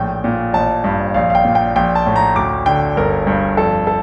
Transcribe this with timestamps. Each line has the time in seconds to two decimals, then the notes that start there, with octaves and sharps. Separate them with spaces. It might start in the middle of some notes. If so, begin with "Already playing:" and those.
Already playing: A#1 A2 G5
0.24 A#2
0.53 A1 A5
0.84 G2
1.14 A#1 F5
1.30 F5
1.35 G5
1.45 A#2
1.55 G5
1.76 A#1 G5
1.95 A5
2.06 A2
2.16 A#5
2.36 D2 D6
2.66 D3 G5
2.97 G1 A#4
3.27 G2
3.57 F2 A4
3.87 A4